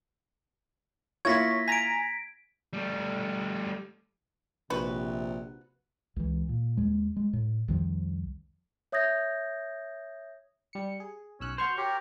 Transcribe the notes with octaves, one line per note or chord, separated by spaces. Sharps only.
A#3 E4 F4 C#5 G#6 A#6 B6
G#5 A#5 B6 D7
G3 A3
A#1 C3 F#4 B4
C#2 E3
A#2
D#2 G#3
G#3
A2
C2 F2 D#3 F3
C#5 E5 D#6 G6 G#6 A#6
G3 C#7
G#4
B1 C#4 E6 F#6
F#4 C5 C6 C#6 F6
G4 A#4 C#5